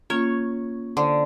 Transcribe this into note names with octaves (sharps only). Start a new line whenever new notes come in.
A#3 C#4 F4 C#5
D3 C5